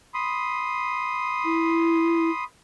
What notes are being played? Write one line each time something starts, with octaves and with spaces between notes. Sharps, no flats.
B5 C6 D#6
E4